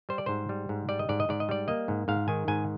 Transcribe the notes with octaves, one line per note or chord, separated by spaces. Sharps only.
G3 C5
D5
G#2 C5
G3
G#2
G3 D5
D#5
G#2 D5
D#5
G#2 D5
D#5
G3 D5
A#3 D#5
G#2
G#2 F5
D#3 G#5
G#2 G#5